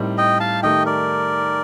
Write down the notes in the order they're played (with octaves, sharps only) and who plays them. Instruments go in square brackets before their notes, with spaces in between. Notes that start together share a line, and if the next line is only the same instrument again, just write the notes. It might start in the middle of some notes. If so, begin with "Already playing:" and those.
Already playing: [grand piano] A2 G3 C4 D#4 A#4
[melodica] D#5 G5
F5 A5
[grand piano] D#3 A3 D#4 G4 [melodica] D#5 G5
[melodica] A#4 D5